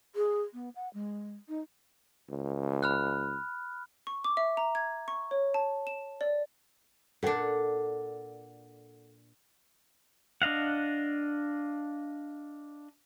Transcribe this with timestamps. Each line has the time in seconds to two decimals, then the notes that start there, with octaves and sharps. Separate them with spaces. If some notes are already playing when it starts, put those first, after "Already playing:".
0.16 G#4
0.54 B3
0.76 F#5
0.94 G#3
1.49 D#4
2.30 C#2
2.83 B5 F6 F#6
4.07 C#6
4.24 D6
4.37 E5
4.57 A#5
4.75 G#6
5.08 C#6
5.31 C#5
5.54 A5
5.87 E7
6.21 D5
7.23 A#2 D4 A4 F#5
10.42 D4 D#5 F5 F#5